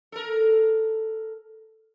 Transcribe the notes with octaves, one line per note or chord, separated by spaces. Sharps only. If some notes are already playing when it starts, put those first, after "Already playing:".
A4 A#4